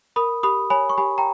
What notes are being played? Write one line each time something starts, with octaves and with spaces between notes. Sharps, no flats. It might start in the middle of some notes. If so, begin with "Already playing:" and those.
A#4 B5 D#6
G4 B5 D#6
C#5 G#5 B5
C#6
G4 G#5 B5
G5 A#5